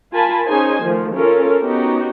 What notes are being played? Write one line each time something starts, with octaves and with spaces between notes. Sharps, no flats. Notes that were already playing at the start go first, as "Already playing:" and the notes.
F4 A#4 G#5 A5 B5
C#4 D#4 G#4 C5 G#5
D#3 F3 A3
C#4 F4 A4 A#4
B3 C#4 D#4 F#4 G4